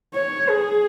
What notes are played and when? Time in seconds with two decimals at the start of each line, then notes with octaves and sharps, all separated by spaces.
0.15 C#5
0.49 G#4